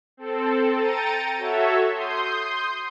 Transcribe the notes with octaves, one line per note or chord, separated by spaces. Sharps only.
C4 A4
G5 A#5 A6 C#7 D#7
F#4 A4 C#5 E5
C6 D#6 G6